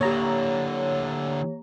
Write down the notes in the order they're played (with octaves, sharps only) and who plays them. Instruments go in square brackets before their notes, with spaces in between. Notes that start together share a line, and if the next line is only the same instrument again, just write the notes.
[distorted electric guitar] D3 E4 [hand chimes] A#3 G4 [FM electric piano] C#5 A#5